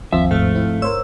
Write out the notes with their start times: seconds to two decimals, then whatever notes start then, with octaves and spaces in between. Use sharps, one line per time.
0.13 G1 D#2 F3 C4 E5
0.31 G#2 A3 F5 F6
0.54 C4 E4
0.82 A#4 C5 C#5 E6